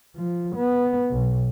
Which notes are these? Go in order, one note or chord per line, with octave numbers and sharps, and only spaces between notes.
F3
B3
B1